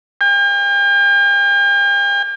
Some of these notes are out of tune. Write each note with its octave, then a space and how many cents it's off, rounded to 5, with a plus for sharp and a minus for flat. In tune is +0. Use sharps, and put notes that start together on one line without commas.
G5 +45